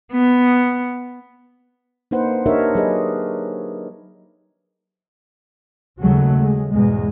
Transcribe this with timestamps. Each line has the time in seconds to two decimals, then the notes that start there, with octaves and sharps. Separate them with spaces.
0.12 B3
2.11 A#3 D4 D#4 B4 C5 F#5
2.46 D4 D#4 G4 A#4 C#5 E5
2.75 F#3 G#4 B4 D#5
6.01 D#2 C#3 F#3 G#3 A3
6.41 G#3
6.72 E2 G#2 B2 G#3